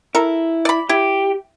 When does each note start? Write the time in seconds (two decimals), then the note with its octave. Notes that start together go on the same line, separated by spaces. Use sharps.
0.15 E4 A4 A#4
0.65 D5 B5
0.89 E4 G4